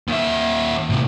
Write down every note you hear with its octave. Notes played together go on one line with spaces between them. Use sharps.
D#2 E5
A2 C3